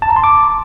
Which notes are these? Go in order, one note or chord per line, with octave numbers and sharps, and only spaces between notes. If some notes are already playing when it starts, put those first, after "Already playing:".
A5
A#5
C6
D6